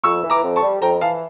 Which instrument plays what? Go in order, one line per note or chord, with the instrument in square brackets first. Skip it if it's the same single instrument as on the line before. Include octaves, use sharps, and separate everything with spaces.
[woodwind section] F2 [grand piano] C#6 E6
[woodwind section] E3
[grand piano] A#5 D6
[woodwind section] F2
[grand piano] A5 C#6
[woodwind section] G3
[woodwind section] F2 [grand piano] G5 A#5
[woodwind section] E3 [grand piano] F5 A5